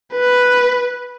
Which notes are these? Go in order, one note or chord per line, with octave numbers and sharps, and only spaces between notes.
B4